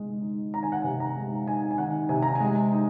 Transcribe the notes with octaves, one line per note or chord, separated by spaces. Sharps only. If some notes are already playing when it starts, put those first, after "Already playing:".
Already playing: C3 G#3
D#4
D#3 A#5
G#5
F#5
C3 G#5
A#5
G#3
D#4 G#5
G#5
D#3 F#5
C3 G#5
A#5
G#5
G#3
D#4